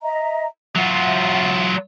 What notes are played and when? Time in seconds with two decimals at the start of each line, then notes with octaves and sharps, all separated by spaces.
0.02 D#5 E5 A#5
0.76 F#3 F4 E5 F#5